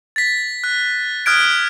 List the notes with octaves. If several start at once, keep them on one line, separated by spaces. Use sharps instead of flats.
A6 B6
F#6
D#6 F6 F#6 G#6 D7